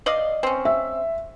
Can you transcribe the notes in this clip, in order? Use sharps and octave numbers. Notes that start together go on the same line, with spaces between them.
D5 D#5 F5
C4 C#4
E5